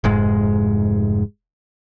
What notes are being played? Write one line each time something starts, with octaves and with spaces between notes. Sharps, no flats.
F1 G#2 G#3